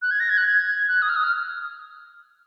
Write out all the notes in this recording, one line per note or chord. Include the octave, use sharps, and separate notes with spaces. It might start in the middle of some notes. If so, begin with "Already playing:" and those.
F#6
G#6
A#6
G#6
F#6
G#6
F#6
D#6
F6
D#6
F6